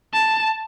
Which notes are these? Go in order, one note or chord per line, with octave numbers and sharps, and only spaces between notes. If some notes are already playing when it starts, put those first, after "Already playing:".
A5